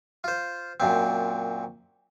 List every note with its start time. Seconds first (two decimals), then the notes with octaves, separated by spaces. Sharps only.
0.24 F4 C5
0.80 F#2 A#2 C4